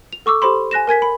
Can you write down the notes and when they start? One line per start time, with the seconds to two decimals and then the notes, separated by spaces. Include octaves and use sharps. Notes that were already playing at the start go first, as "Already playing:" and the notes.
0.13 F7
0.26 A4 C#6 D6 E6
0.42 G4 A4 C5 B5 C6
0.71 G#5 F#6 A#6 E7
0.87 A#4 G#5 G#6 B6
1.02 B5